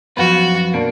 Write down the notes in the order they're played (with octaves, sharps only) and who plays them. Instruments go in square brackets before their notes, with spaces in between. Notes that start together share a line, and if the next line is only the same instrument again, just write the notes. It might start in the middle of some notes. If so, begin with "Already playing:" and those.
[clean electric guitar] F#2 F3 B3 F4 B4 [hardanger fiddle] F#4
[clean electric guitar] B2 A#3 D4